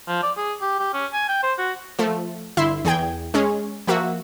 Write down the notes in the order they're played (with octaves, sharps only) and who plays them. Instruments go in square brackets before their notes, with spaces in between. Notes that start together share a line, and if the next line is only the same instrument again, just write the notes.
[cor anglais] F3
D5
G#4
G4
G4
C#4
G#5
G5
C5
F#4
[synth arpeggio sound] F3 A3
G1 E4 E5 C6
E2 G#4 G5 G#6
G#3 C#4 G#4
F3 A#3 F#4 E5